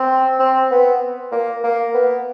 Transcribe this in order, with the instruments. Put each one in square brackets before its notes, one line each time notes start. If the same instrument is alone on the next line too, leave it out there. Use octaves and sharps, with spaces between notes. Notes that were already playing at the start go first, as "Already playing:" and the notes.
Already playing: [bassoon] C4
C4
B3
A#3
A#3
B3